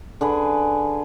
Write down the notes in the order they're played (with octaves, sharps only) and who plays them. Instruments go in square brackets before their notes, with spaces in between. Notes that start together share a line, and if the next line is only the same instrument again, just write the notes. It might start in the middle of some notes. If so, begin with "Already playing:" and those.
[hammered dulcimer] D3 G#4 B4